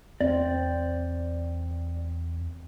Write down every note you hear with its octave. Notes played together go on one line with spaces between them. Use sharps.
E2 C4 D5